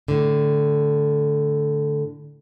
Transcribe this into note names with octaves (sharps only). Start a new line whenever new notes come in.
A2 D3